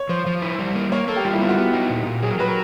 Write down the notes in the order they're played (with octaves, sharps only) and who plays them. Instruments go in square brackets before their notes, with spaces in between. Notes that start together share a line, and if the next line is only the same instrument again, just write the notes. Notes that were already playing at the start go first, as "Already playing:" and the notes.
Already playing: [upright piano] C#5
[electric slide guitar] F3 [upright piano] C5
[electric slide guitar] F3
E4
G3
A#3
[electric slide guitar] A#3 [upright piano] C#5
[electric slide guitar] A#3 [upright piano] A4
[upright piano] G4
[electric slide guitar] G3 [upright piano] F4
[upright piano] E4
[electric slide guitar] B3 [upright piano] F4
[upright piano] F#4
[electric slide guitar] B3 [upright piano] G4
[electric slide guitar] D#4
A#2
A#2
[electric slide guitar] F#3 [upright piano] G#4
[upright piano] A#4
[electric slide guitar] F#3 [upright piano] B4
[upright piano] A#4